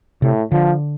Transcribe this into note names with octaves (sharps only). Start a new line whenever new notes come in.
A2 C3
D3 F3